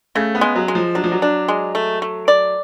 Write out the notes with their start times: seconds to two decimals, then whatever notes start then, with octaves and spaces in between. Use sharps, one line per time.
0.15 C#3 A3
0.35 B3
0.41 G#3
0.56 F#3
0.68 G#3
0.75 F3
0.95 F#3 D4
1.04 F3
1.12 F#3
1.22 D4
1.48 G#3
1.75 A3
2.02 A3
2.28 D5